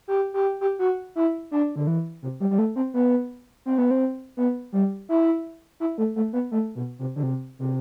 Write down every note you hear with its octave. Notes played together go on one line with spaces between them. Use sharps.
G4
G4
G4
F#4
E4
D4
D3
E3
C3
G3
G3
A3
C4
B3
C4
B3
C4
B3
G3
E4
E4
A3
A3
B3
A3
B2
C3
D3
C3
C3